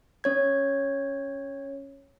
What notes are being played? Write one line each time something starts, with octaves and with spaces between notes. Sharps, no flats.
C#4 C#5 G#6